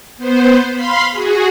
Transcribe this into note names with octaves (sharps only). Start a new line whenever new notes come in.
B3 C5
F5 B5 C6
F#4 G#4